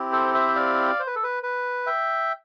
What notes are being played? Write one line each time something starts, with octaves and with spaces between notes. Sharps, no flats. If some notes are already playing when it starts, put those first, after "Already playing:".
Already playing: C4 E4 G4
A4 C5
C5 E5
D5 F5
C5
B4
A4
B4
B4
E5 G5